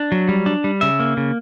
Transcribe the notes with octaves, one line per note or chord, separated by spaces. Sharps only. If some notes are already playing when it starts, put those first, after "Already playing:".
Already playing: D4
F#3
G3
D4
G3
C#3 E5
A#3
C#3